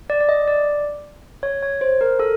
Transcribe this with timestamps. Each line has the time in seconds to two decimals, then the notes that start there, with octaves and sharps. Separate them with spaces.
0.10 D5
0.21 D5
0.29 D#5
0.48 D5
1.43 C#5
1.62 C#5
1.81 C5
2.01 A#4
2.20 A4